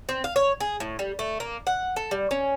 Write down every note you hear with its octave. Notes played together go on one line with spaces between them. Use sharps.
C4
F5
C#5
G#4
A2
G3
A3
A#3
F#5
A4
G3
C#4